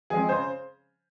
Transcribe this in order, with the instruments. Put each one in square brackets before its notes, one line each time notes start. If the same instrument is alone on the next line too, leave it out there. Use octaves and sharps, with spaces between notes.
[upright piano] F3 G#3 C4 G#4
C#3 C5